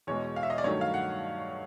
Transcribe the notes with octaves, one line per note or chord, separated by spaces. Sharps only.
E2 B2 G#3 C#5
F5
E5
D#5
D5
G2 D#3 F#3 A3 C#5
F5
F#5